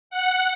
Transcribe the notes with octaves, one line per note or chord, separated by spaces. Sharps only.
F#5